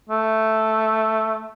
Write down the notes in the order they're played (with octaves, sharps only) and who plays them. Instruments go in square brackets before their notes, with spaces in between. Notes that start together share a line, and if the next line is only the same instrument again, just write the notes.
[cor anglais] A3